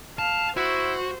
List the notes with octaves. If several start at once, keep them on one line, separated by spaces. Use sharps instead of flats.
F5 A5
E4 F#4 C5